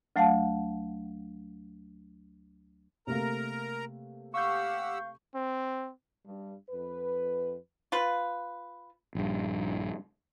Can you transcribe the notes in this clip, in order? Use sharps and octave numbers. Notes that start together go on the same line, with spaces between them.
D2 F#3 A3 F5 F#5 A5
C3 A3 A#3 A#4 A#5
G4 F5 F#5 C#6 E6 G6
C4
G2
F2 B4
F4 B4
A#1 G2